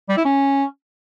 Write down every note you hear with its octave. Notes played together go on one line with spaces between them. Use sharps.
G3
E4
C#4